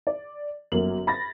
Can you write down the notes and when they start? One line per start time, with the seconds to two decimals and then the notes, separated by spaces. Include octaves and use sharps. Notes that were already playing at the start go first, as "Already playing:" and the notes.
0.07 D5
0.72 G1 F#2 A#3 F#7
1.07 B5 A6 A#6